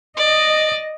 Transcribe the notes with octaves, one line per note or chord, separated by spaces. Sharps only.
D5 D#5